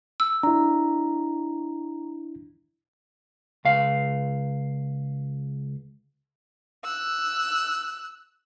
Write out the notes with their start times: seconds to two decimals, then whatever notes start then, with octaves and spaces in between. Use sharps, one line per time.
0.20 E6
0.43 D4 E4 A#5
3.65 C#2 F5
6.84 E6 F#6